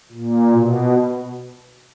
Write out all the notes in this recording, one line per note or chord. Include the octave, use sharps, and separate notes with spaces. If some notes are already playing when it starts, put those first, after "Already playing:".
A#2
B2